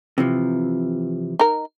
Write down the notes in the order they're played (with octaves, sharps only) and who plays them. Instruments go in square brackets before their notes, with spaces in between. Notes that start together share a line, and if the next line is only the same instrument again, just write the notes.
[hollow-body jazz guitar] C3 E3 F3
[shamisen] D#4 A#4